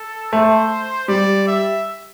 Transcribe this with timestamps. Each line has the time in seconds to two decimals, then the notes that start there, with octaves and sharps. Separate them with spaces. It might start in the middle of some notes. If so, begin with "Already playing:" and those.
Already playing: A4
0.32 A3 C5
1.08 G3 D5
1.47 E5